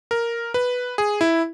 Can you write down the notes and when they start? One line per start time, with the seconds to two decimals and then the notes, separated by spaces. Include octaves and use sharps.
0.11 A#4
0.54 B4
0.98 G#4
1.21 E4